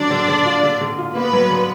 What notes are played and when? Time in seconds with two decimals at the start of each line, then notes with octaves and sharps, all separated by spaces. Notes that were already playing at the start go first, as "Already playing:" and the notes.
Already playing: D3 F#3 D4 D5
0.11 D3
0.28 D3
0.45 F4
0.63 D3
0.81 D3
0.98 F4
1.15 A#3 B3 B4
1.33 F#3
1.50 D3